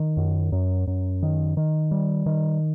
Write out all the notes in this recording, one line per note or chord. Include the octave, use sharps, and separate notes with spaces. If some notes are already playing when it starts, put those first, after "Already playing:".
Already playing: D#3
F#2
F#2
F#2
D#3
D#3
G3
D#3